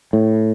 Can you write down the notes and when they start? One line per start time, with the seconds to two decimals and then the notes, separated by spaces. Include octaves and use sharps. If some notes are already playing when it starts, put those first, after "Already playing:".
0.13 A2